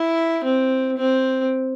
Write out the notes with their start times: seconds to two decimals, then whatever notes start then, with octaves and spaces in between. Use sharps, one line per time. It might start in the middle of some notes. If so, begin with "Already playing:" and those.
Already playing: E4
0.44 C4
0.97 C4